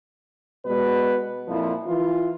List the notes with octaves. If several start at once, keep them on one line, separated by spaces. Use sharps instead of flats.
B2 G#3 B4 D5
F2 A#2 F3 E4
E3 F4